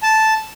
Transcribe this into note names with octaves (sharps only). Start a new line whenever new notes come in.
A5